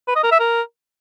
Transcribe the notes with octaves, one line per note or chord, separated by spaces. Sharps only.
B4
D#5
A#4
E5
A#4